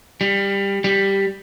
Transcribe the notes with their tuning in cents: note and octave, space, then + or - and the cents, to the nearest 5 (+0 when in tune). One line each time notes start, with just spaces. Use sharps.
G3 +15
G3 +0